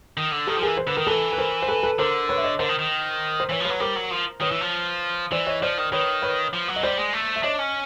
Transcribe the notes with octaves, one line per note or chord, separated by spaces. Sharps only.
D#3
D3
D#3 G4 A4
F3
E3 G#4 A#4
C5
D3 B4
D#3 A#4
E3 A4 B4
B4
A#4 C5
C5
A4 B4
A4 B4
D3 A#4 C5
B4 C#5
E5
C#5 D#5
D3 A#4 C5
D#3
D#3
C5
E3 B4 C#5
F3
F#3 B4 C#5
G3 A#4 C5
F#3
F3
D#3 B4 C#5
E3
F3
E3 C5 D5
C#5 D#5
F3 C5 D5
D#3
D#3 B4 C#5
B4 C#5
F3
F#3
D#5
G3 C5 D5
G#3
A3
E5
D4 C#5 D#5
C#4